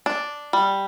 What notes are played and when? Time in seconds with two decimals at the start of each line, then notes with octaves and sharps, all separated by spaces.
0.06 D4
0.53 G3